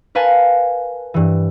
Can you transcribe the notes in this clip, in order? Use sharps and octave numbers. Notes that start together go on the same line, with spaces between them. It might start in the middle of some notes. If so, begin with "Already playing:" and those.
A#4 B4 F5 G#5 A5
G2 E3